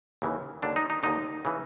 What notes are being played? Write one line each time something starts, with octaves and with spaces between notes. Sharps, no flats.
D#2 C#3 E3
D#2 D3 D4
D#4
D#4
D#2 D3 D#4
C#3 E3